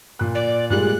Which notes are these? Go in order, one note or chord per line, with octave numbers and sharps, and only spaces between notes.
A#2 F#6
D5
A#2 G3 G#3 F#6